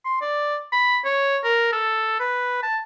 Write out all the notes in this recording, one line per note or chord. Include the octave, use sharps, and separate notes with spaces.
C6
D5
B5
C#5
A#4
A4
B4
A5